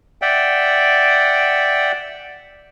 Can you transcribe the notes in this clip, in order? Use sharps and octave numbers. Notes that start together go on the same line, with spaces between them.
D5 E5 F#5 G5